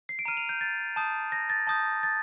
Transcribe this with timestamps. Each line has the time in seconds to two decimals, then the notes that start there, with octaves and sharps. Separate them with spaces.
0.09 C7
0.19 D7
0.25 A#5 F6 D#7
0.37 F7
0.49 G6
0.61 A6
0.96 A5 D#6 G6
1.32 A#6
1.50 A6
1.67 A5 D#6 G6
2.03 A6